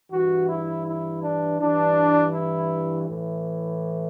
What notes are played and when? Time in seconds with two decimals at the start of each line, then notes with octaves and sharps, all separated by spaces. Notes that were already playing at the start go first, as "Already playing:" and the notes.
0.11 G2 E3 F#4
0.49 E4
0.86 E4
1.23 D4
1.59 G2 E3 D4
2.34 E4
3.08 A2 E3